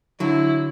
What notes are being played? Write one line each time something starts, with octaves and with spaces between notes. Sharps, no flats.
D3 F#3 E4